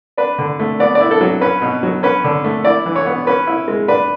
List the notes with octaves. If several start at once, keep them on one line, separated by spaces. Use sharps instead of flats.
D4 B4
D3
A3
B3 D5
D5
E4
A4
F#3
C#4 B4
B2
F#3
C#4 B4
D3
A3
E4 D5
E3
C#5
B3
C#4 B4
E4
G#3
D4 B4